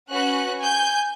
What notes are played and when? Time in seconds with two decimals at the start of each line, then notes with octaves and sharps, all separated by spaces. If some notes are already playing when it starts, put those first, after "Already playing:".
0.10 C#4 F#4 B4 F#5 F#6
0.59 G#5 G6